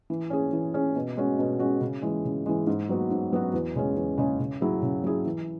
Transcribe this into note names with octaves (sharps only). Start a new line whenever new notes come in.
E3
C#4 G#4
E3
C#4 G#4
B2
G#3 C#4 F#4
B2
G#3 C#4 F#4
C#3
E3 G#3
C#3
E3 G#3
G#2
F#3 B3 F#4
G#2
F#3 B3 F#4
E2
C#3 G#3 C#4
E2
C#3 G#3 C#4
C#3
F#3 E4 G#4
C#3
F#3 E4 G#4
E3